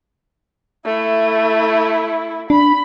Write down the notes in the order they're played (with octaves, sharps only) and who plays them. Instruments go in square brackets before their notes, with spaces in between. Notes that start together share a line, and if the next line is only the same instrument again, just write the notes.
[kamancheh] A3 E4
[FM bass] D4 [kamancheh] B5